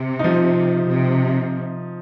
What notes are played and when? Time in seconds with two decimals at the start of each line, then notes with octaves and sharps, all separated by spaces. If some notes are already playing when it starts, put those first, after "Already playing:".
Already playing: C3
0.19 F3 D#4
0.88 C3